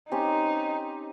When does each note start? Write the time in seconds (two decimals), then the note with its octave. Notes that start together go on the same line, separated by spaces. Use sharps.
0.12 C4 C#4 D#4 G4